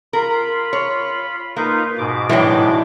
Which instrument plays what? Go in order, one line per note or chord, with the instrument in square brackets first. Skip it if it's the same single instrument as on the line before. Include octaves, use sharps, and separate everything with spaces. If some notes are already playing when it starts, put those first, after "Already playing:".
[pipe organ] F4 B5 [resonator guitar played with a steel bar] A#4
[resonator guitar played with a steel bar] C#5
[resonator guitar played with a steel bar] A#3 [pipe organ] D#4 F4 B4
[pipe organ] G#2 B2 D6
[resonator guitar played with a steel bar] A2 G3 D4 [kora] E3 F#3